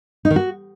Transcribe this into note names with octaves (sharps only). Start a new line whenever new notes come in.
D#4
D#3
F#4